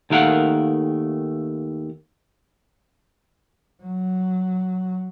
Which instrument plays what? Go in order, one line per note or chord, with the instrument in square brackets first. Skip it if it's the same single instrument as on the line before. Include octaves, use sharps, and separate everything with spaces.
[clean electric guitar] D#2 D#3 A3 A#4 F5 F#5
[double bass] F#3